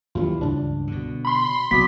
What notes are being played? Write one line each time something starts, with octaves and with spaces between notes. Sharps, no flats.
D#2 E3 F#3 G3 F4
C#2 G2 D4
B2 D3
B5 C6
C2 B2 F#3 A#3 D6 D#6 B6